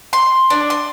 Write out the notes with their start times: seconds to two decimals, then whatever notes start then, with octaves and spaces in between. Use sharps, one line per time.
0.13 C6
0.50 D4
0.70 C6